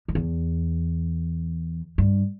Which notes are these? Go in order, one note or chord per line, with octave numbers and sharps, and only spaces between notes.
F#2
E2
G2